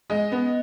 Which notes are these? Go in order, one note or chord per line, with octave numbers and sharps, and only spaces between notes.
G#3 D#5
B3